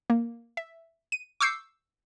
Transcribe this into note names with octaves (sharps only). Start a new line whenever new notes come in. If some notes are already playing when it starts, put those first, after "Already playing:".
A#3
E5
D#7
C#6 D6 E6 G6 C7 C#7